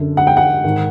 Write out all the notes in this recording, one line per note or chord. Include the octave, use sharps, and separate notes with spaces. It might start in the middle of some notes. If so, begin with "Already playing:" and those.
Already playing: F#2 D3
F#5
G5
F#5
G#2 D#3